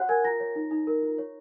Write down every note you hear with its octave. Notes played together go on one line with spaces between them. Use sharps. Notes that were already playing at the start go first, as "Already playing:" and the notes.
Already playing: F#4 C#5 F#5 F#6
A#4 G#5 G#6
F4 A#5 A#6
C#5
D#4
D#4
A#4
F4
C#5